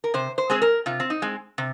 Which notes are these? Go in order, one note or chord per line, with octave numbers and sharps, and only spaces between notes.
A#4
C3 C5
C5
G#3 C4 G#4
A#4
C3 F4
C4
D#4
G#3 C4
C3